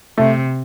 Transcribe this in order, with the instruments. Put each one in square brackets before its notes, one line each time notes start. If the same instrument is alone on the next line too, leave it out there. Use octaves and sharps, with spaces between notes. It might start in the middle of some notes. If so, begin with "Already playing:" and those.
[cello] C3 [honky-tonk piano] A3